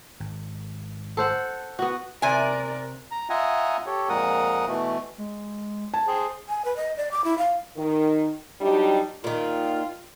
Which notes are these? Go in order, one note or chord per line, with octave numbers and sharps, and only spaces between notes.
G#1
A4 C5 F#5
B3 F#4
C3 A#4 D5 G#5
A#5
F4 D#5 E5 F#5 G#5 A#5
G4 A4 C#5
F2 A#2 G#3 A#4 F#5 D#6
B2 E3 A3
G#3
A5 G#6
G#4 C5 G5
G#5
B4
D#5
D5
D6
E4
F5
D#3
F#3 G3 D4 D#4 G4
A#2 D#3 F4